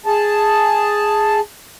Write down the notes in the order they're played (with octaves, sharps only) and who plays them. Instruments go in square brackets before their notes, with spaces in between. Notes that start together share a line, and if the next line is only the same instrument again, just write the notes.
[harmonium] G#4 A5